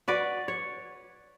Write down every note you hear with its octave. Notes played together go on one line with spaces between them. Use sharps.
F#4 B4 D5
C#5